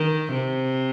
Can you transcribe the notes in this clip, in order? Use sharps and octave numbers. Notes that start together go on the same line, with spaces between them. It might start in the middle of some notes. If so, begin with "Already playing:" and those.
Already playing: D#3
C3